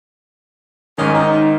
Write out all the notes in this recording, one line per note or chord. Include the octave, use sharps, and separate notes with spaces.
G#2 D#3 C#4 A#4 D#5
D#4